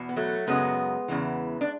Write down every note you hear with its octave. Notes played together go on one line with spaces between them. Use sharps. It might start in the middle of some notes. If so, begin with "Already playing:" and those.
Already playing: E2 B2
B3
F#3 A3
F#2 C#3 F#3 G#3 B3
E2 C#3 E3
D4